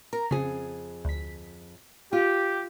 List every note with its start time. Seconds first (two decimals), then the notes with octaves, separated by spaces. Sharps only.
0.13 A#4 A#5
0.31 F2 C#3 G#4
1.05 D2 B6
2.13 F4 G4